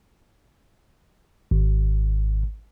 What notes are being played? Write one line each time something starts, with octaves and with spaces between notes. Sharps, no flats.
G#1